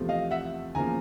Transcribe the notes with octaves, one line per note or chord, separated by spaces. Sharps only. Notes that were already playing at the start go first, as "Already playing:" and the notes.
Already playing: E2 C3 F3 A3
D#5 F5
E5 F#5
E2 C#3 F3 A#3 G#5 A#5